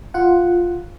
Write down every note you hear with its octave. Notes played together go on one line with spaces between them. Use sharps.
F4 F#5